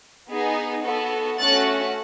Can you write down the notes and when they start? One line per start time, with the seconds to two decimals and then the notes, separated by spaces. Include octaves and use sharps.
0.29 B3 D#4 G#4
0.83 B3 F#4 A4
1.38 A3 C#4 F#4 F#6 A6